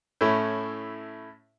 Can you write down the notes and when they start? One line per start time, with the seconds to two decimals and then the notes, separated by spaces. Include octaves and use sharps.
0.21 A2 A3 C#4 E4